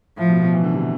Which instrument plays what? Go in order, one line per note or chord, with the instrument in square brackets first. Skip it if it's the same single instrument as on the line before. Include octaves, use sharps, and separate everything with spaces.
[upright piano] A2 [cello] F3
[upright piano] B2
B2
E3
D3
C3